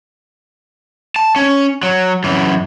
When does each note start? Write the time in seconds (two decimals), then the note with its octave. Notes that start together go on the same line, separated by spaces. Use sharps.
1.16 A5
1.36 C#4
1.83 F#3
2.24 F#2 E3